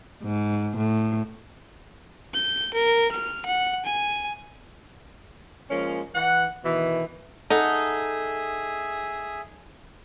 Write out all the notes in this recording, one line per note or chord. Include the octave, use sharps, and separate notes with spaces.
G#2
A2
G6
A#4
F6
F#5
G#5
F3 G#3 A#3 C#4
E3 F#5
B2 D#3 E3
D#4 G#4 A4 E5 F#5 D#6